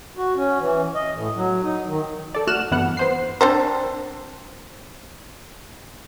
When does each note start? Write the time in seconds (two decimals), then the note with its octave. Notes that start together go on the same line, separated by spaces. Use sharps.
0.17 F#4
0.36 C#4
0.60 E3
0.95 D#5
1.14 A2
1.36 F#3
1.63 D#4
1.87 D#3
2.35 A4 D5
2.47 A3 F#4 F6 F#6 E7
2.71 G2 E3 B3 F#5
2.97 B3 C5 C7
3.41 C4 D4 C5